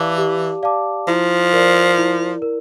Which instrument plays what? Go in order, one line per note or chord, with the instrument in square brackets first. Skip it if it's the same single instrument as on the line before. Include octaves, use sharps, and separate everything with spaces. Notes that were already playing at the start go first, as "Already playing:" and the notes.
Already playing: [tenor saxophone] E3 [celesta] G4 D5 F5 A5 D6
[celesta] G4
D5 F5 A5 D6
[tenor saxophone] F3 [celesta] E4
[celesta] A#4 D5
E4
A#4